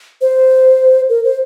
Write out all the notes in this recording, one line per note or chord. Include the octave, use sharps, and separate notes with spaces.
C5
A#4
C5